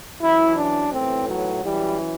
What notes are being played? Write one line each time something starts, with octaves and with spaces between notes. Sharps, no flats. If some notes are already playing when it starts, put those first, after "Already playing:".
F#2 E3 E4
D4
B1 A2 E3 C4
F#3
F#2 E3 G3